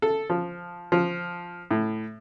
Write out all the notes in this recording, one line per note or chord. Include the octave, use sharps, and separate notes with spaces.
A4
F3
F3
A2